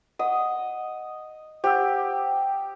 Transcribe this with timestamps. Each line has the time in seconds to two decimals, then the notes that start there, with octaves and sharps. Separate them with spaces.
0.19 D#5 F#5
1.64 G4 C5 F#5 E6